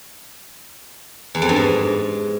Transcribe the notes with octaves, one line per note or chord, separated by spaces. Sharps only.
E2
F2
G2
G#2